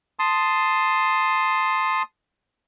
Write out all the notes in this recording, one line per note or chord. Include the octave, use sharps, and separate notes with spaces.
A5 C6 D#6